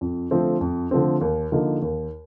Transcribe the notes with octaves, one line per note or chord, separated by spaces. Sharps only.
F2
D3 F3 A3 C4
F2
D3 F3 A3 C4
D#2
D3 F3 A#3 D#4
D#2